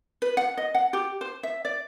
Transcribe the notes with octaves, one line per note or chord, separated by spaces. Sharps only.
B4
F#5
D#5
F#5
G4
C5
E5
D5